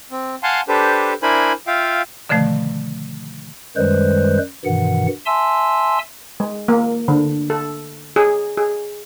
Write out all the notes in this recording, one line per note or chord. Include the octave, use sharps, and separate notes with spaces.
C4
F5 F#5 G#5 A5 C6
D4 G4 A4 B4 C5
D4 E4 A#4 C5 G#5 B5
F4 E5 F5 G5
B2 D3 D#3 F3 A3
F#2 D#3 G3 G#3 B4 C5
G2 B2 D#3 E3 F#5
E5 G#5 A5 C6 E6
G#3
A#3
D3
A4
G#4
G#4